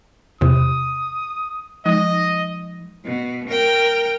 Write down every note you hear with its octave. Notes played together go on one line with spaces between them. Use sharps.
E2 C3 D#6
F3 G#3 D#4 D#5
B2
A#4 G5